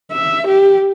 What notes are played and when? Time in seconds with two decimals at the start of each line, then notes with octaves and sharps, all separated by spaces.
0.11 E5
0.48 G4